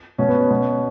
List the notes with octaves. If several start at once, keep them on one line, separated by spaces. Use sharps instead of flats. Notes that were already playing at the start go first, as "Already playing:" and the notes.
B2 C#4
B3
C#4
B2